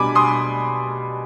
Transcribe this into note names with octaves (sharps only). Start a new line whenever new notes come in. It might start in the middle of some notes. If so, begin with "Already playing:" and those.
Already playing: B2 G3 D4 G#5 B5 D6
C6 D#6